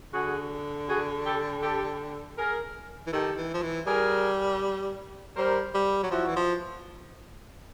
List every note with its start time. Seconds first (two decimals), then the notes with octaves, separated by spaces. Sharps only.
0.13 D3 F#4 G#4
0.88 F#4 G#4
1.26 G4 A4
1.63 G4 A4
2.37 G#4 A#4
3.07 E3
3.12 D#3 G4 A4
3.37 E3
3.54 F3
3.63 E3
3.87 G3 G#4 A#4
5.36 G3 A#4 C5
5.74 G3
6.03 F#3
6.11 F3 E4 F#4
6.27 E3
6.36 F3